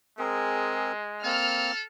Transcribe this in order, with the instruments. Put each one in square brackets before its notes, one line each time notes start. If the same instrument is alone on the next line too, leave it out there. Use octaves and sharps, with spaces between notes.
[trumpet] G#3 [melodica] C4 G#4 A#4
[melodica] A#3 C4 [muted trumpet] A4 [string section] F6